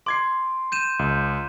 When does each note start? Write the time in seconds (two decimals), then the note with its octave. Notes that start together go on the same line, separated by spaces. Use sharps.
0.06 C6 D6 G#6 C7
0.72 G6 D#7 E7
0.99 C#2